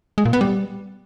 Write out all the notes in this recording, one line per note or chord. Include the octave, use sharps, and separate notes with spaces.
G#3
A#2
B3
G3